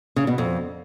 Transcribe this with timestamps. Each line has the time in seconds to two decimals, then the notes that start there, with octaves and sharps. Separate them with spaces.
0.16 C#3
0.27 B2
0.38 F2